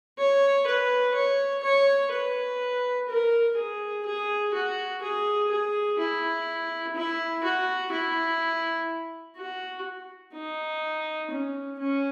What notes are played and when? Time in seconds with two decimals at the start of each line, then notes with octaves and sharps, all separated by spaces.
0.18 C#5
0.66 B4
1.14 C#5
1.63 C#5
2.11 B4
3.09 A#4
3.57 G#4
4.06 G#4
4.54 F#4
5.02 G#4
5.51 G#4
5.99 E4
6.96 E4
7.44 F#4
7.91 E4
9.37 F#4
10.34 D#4
11.30 C#4
11.79 C#4